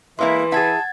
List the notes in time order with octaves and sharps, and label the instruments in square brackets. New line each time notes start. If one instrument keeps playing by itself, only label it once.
[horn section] E3 [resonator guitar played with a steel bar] G#3 A#3 E4 [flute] E5 [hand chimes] C6
[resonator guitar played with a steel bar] E4 G#4 [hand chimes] F#5 G#6 A6 [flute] A5